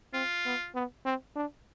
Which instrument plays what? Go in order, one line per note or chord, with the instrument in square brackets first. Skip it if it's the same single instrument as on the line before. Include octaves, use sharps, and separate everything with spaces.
[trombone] C4 [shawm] F4
[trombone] B3
B3
C4
D4